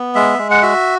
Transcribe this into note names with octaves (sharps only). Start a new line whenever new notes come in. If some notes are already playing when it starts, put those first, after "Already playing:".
Already playing: B3
G#3 E5
G#3
F#5
F#4 E5